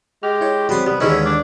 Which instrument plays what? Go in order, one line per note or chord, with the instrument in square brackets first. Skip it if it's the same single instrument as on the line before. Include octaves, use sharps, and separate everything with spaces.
[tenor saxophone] G#3 [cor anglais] G4 [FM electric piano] F6
[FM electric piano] E4 C#5
[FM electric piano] F#3 C4 [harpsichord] G3 C6 [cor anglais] B3
[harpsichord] C2 [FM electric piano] G3 [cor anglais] B3
[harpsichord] D#2 D3 E3 [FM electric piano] G#3 D#4 [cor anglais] C#4 [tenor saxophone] E4
[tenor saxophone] D4 [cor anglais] D5